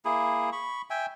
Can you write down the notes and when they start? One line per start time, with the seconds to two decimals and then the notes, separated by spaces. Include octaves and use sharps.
0.05 A#3 E4 G#4
0.52 B5 C#6
0.90 E5 G5 G#5